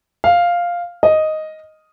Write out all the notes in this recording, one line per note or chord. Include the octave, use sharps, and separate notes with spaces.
F5
D#5